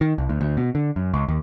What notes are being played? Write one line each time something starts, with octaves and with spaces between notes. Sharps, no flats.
D#3
C2
D2
D2
B2
D3
F#2
C#2
D#2